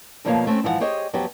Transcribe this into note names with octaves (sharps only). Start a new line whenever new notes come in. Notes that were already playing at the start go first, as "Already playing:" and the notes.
D2 B2 F3 A#3 C#5 F5
A3 C4 C#4
G#2 E3 F3 C5 F#5
G4 G#4 C5 C#5 D#5
F2 F#3 B3 G4